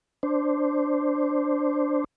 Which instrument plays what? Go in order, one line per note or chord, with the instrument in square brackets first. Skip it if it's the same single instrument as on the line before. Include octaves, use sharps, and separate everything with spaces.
[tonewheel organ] D4 C5